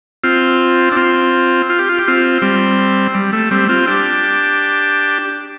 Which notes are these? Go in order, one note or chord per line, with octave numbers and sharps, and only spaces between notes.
C4 F4
D4
C4 F4
F4
G4
F4
G4
C4 F4
G3 C4
G3
A3
G3 C4
C4 F4
D4 G4